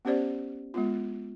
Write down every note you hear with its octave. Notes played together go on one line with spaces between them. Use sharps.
B3 C#4 G4 C5 D5
G#3 B3 F4